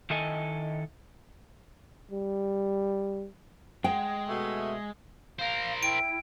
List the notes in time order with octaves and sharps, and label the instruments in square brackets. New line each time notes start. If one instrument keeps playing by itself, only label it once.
[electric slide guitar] D#3 E4 A4 D#5 G#5
[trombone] G3
[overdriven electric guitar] G#3 [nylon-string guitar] G5
[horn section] B2 A3 E5
[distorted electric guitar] A#4 C5 [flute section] F5
[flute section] E4 G5 [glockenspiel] D7